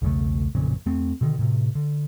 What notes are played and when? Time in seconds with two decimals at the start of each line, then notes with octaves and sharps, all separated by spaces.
0.02 B1 E2 C#3 A3
0.55 A1 F2 A#2 C#3
0.86 E2 A3 C4
1.21 B2 D3 D#3
1.39 A2 C3
1.75 D3